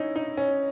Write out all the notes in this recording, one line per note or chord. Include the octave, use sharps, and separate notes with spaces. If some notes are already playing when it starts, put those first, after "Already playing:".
Already playing: C#4 D#4 E4
D#4
C#4